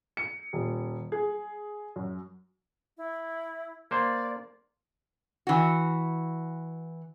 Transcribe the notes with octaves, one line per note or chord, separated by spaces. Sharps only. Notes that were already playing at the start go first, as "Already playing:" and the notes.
C#7
D#1
G#4
F#2
E4
A#3 C5 D5
E3 F#4